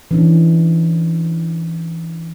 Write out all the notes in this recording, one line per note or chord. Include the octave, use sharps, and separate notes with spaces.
E3 C#4 D4